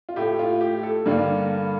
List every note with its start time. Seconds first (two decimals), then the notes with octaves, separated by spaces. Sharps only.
0.09 F4
0.16 A2 A3 G4
0.39 F4
0.61 G4
0.83 A4
1.06 G2 D3 G3 A#3